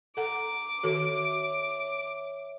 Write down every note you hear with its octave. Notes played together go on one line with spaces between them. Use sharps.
A4 F#5 A#5 D6
D#3 F#4 A4 C#5 E5